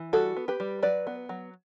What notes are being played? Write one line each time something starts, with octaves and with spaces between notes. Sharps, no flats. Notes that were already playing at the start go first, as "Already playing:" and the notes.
Already playing: E3
G3 F#4 A4
B3
G4 B4
G3
F#3 B4 D5
B3
F#3